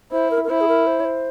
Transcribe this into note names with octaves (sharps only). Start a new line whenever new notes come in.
E4 C5
A#4
A#4
E4 C5
G#4
A#4
C5
C#5
C5